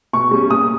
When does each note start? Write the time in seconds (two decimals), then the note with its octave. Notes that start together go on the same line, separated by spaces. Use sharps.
0.13 B2 C#6
0.31 G3 C#4
0.50 A#2 D#6